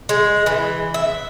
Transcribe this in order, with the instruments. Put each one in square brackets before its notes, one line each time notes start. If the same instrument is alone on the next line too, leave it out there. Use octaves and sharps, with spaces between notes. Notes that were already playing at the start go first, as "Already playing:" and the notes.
[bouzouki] G#3
E3
E5